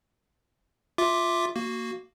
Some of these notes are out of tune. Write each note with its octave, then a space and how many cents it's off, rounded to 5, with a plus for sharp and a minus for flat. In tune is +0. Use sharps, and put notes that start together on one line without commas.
F4 +0 E5 +0 D6 +0
A#3 -5 F#4 +0